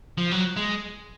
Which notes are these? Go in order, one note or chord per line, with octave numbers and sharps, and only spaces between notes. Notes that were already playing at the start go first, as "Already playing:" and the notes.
F3
F#3
G#3